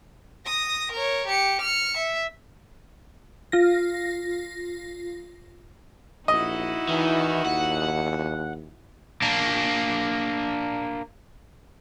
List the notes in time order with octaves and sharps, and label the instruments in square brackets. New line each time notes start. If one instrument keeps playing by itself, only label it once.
[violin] D#6 A#6
A#4 C#5
G4 C#7
F6 C#7
E5
[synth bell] F4 A#6
[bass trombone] A#1 [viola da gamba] D#4 E4 F#4 [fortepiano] D#5
[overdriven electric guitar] D#3 [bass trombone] E3
[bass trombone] D#2 [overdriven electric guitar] F#5
[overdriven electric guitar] A#3 D4